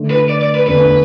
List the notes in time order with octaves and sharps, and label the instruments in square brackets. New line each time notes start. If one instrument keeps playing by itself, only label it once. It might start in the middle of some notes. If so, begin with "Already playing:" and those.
Already playing: [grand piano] D3 A3 D4
[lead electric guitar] B4
D5
D5
B4
[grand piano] E2 D3 A3 D4 [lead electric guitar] B4